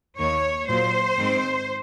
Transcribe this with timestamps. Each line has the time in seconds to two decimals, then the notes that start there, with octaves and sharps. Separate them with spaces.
0.17 D#2 D#3 A#3 C#5
0.67 A#2 F#3 A#3 C5
1.17 G#2 D#3 G#3 C4